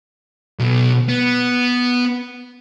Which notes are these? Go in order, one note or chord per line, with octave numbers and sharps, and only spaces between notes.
B1 B2
B3